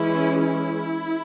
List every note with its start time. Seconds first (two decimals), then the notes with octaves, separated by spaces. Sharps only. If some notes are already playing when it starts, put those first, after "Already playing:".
Already playing: E3 G#3 C#4 E4
0.44 E4